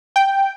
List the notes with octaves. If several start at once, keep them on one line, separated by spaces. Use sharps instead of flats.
G5